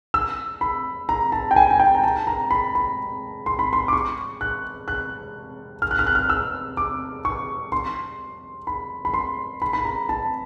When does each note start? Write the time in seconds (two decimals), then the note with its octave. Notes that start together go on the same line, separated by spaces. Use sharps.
0.14 E6
0.61 B5
1.09 A#5
1.32 A5
1.51 G5
1.56 G#5
1.71 G#5
1.80 G5
1.95 A#5
2.03 A5
2.27 A#5
2.51 B5
2.75 B5
3.46 C6
3.59 B5
3.73 C6
3.88 D6
3.93 C#6
4.41 F#6
4.88 F#6
5.82 F6
5.91 F#6
5.99 F6
6.07 F#6
6.15 F6
6.29 E6
6.77 D6
7.25 C#6
7.72 C6
8.67 B5
9.05 B5
9.14 C6
9.62 B5
9.73 B5
9.85 A#5
10.09 A5